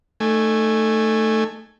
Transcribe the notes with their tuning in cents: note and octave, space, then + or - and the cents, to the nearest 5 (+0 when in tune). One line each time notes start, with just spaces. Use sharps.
A3 +5 D#4 -20 G#5 +0